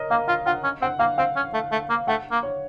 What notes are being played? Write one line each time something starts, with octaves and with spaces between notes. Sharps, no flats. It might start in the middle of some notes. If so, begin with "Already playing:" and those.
Already playing: A#4 C#5 D#5
A#3 F5
F4 F5
F4 F#5
C#4
C4 F#5
A#3 F5
C4 F5
C#4
A3
A3
A#3
A3 F#5
A#3
C#5